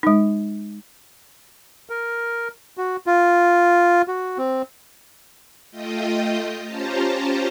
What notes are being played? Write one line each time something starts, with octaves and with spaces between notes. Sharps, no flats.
G#3 D#4
A#4
F#4
F4
F#4
C4
A3 F4 D#5 G5 D#6
C#4 F4 G4 C5 A5 A#5